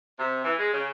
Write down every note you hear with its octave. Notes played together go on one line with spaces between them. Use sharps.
C3
E3
G#3
C#3